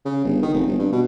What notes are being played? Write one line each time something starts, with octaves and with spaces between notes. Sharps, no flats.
C#3
G1
D#3
F1
G1
G2
B2